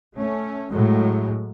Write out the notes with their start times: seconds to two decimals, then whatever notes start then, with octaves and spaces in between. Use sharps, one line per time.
0.16 A3 C#4
0.71 A2 F#3 G#3